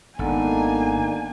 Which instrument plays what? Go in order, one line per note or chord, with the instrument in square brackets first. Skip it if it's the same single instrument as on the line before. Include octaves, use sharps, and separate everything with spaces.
[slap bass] G#1 [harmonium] A#3 D4 D#4 [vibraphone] B3 A4 F#5 [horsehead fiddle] G#5